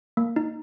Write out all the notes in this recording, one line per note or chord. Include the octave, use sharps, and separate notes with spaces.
A#3
D#4